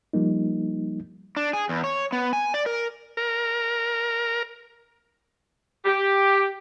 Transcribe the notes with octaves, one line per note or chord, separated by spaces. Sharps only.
F3 G3 A#3 D#4
D4
G#4
E2
C#5
B3
G#5
D5
A#4
A#4
G4